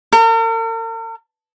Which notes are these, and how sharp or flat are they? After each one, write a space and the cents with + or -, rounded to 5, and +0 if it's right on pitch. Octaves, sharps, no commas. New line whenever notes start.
A#4 -45